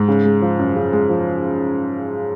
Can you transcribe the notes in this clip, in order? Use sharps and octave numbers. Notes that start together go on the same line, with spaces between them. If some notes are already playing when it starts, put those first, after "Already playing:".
Already playing: G#2
C#3
G#3
F3
F#2
C#3
G#3
F3